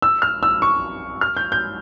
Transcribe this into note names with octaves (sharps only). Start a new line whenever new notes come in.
E6
F6
E6
C#6
F6
G6
G6